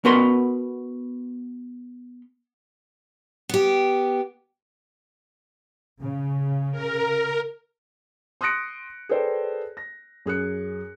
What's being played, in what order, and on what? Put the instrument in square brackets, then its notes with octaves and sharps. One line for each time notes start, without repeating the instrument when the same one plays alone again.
[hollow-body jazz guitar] B3 F#4 A#4 B4 C6
[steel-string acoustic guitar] B3 G4
[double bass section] C#3
[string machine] A#4
[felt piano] C6 D#6 F#6 A#6 C#7 D7
G#4 A4 B4 C5 D5 G5
A#6
F#2 G#4 F#6 C#7